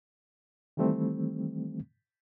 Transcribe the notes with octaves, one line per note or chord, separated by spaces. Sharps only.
D#3 E3 G3 A3 C4